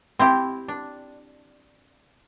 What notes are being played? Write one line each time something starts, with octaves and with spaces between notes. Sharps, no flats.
C4 E4 G4
D4